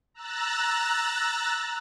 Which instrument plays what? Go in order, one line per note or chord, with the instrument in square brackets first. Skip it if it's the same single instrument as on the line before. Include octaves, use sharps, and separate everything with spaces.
[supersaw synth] A#5 E6 F#6 A6